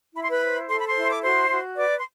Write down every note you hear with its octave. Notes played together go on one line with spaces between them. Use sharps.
E4 B5
C6
B4 B5
C5
A4 C6
B5
C5 C6
E4
D6
F#4 C5 C6
F#4
B4 D5 D6
C6